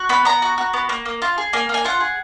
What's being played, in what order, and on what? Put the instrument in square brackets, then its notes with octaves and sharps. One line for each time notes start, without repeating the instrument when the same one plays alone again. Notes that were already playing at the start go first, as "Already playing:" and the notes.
Already playing: [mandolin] F#4
B3 B5
B3 A#5
F#4
F#4
B3
A#3
A#3
F4
G#4
A#3 G#5
A#3
G#5
F4 F#5
G#4